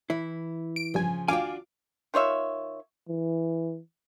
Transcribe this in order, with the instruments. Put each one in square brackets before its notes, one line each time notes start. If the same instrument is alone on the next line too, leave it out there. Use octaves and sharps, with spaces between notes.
[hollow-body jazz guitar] E3 E4
[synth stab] D7
[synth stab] A1 G2 G#5 [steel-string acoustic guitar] C#3 F3
[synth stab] D2 F5 D6 [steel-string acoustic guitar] D4 F4 F#4 [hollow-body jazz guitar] G5 G#5
[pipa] D#3 F4 C#5 E5
[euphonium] E3